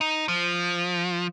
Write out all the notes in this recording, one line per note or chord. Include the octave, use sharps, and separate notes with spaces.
D#4
F3